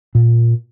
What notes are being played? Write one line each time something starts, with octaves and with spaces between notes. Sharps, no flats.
A#2